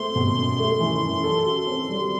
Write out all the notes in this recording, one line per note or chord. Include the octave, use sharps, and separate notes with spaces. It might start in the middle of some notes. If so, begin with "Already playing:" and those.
Already playing: A3 C4 C6
B2
F#2
A3
E3
F#2
A4
F#4
C4
G3